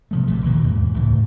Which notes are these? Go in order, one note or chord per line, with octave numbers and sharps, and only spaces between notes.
C3 F3 A3
A#1 A#2 D3 E3
D#2 B2 A#3
E2 G#2
C#2 A2 C3 E3